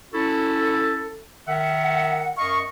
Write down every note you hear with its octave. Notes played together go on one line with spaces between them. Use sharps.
C#4 E4 F#4 A4
D#3 E5 F#5
F#2 D#5 F5 C#6